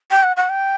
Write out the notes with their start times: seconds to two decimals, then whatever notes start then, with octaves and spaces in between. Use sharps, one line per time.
0.11 G5
0.23 F#5
0.37 F#5
0.49 G5